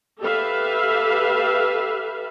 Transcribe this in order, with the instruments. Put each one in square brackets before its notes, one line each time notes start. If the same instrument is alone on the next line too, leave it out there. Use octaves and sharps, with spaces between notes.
[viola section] G4 A4 B4 E5 F5